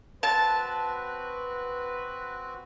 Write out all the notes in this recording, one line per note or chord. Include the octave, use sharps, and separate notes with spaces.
C4 F#4 B4 A5